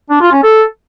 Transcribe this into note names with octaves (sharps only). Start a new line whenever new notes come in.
D4
F4
C#4
A4